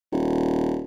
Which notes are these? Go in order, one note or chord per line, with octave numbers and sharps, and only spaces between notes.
D#1